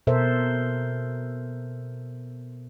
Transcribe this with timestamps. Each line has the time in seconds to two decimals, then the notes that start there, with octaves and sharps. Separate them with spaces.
0.07 B2 A4 A#4 C5 E5